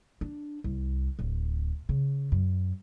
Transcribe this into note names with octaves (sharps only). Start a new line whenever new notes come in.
D4
C2
D1
C#3
F#2